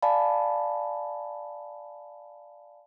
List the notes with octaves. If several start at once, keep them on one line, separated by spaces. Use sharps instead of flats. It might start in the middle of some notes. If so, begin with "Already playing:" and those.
D5 F5 G#5 A5 B5